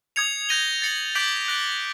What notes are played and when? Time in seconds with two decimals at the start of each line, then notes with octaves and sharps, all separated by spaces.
0.16 D#6 G#6 C#7 F7
0.49 G6 A#6 D#7 G7
0.82 A6 C#7 F#7
1.15 D6 G6 B6 D7 F#7
1.48 F#6 A#6 D7 G7